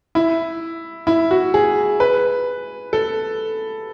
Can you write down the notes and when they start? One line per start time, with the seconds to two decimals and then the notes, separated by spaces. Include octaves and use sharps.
0.15 E4
1.07 E4
1.31 F#4
1.54 G#4
2.00 B4
2.93 A4